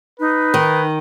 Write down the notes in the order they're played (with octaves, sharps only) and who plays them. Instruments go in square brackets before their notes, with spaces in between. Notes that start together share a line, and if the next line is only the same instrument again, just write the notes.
[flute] D#4 [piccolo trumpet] B4
[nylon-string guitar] D#3